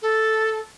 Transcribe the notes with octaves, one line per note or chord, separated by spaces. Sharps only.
A4